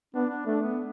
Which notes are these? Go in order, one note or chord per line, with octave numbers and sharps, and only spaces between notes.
B3 D4
D4
A3 D4
B3